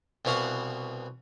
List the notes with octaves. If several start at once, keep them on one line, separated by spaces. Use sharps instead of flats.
C2 B2 E3 F#4 F5 F#5